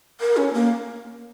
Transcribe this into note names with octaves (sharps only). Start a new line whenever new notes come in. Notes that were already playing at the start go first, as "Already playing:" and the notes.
A#4
C#4
A#3